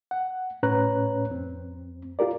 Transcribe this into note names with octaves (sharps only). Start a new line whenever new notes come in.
F#5
A2 C#4 B4 C#5 A#5 F#6
F2 C4
F4 G4 A#4 D5